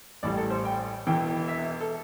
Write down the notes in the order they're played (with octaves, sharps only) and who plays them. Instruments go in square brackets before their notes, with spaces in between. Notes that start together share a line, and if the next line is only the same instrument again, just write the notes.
[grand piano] A1 A2 G3 D5
A4
C5
G5
E1 E2 E3 G5
E5
A4